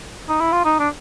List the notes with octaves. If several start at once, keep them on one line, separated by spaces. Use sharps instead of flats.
D#4
E4
F4
D#4
D4